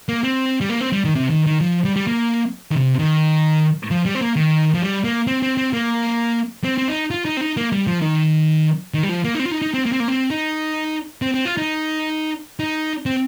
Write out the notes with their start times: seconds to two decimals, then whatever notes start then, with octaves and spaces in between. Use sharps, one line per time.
0.09 A#3
0.24 C4
0.61 G3
0.70 A#3
0.81 C4
0.92 G3
1.05 D#3
1.15 C3
1.30 D#3
1.46 D#3
1.61 F3
1.85 G3
1.96 G3
2.07 A#3
2.72 D#3
2.76 C3
2.99 D#3
3.91 F3
4.06 G3
4.15 C4
4.21 A#3
4.36 D#3
4.74 F3
4.82 G3
5.04 A#3
5.27 C4
5.42 C4
5.57 C4
5.73 A#3
6.64 C4
6.78 C4
6.88 D#4
7.11 F4
7.25 D#4
7.37 C4
7.41 D#4
7.57 A#3
7.72 G3
7.87 F3
8.01 D#3
8.94 D#3
9.03 G3
9.09 F3
9.24 A#3
9.35 D#4
9.39 C4
9.45 F4
9.51 D#4
9.62 D#4
9.74 C4
9.86 A#3
9.92 C4
10.00 A#3
10.08 C4
10.31 D#4
11.22 C4
11.34 C4
11.45 F4
11.57 D#4
12.60 D#4
13.06 C4